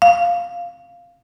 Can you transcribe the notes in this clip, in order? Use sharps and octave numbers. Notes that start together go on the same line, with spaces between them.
F5